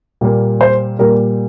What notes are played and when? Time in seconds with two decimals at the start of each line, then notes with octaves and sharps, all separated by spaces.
0.21 A#2 G3 A#3
0.61 C5
0.99 A#2 G3 A#3 A#4